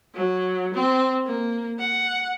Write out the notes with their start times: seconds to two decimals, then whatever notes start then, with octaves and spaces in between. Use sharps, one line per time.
0.15 F#3
0.74 C4
1.26 A#3
1.79 F#5